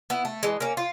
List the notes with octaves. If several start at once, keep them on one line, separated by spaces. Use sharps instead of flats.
B3 E4
A3
E3 G#3
A#3 C#4
F4